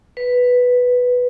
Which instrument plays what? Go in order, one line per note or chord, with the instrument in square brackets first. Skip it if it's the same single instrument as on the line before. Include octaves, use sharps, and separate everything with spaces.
[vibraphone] B4